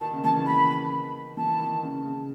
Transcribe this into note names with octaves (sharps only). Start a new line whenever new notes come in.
D#3 A5
C#3
E3 A5
D#3
D#3 B5
E3 A5
D#3
C#3
C#3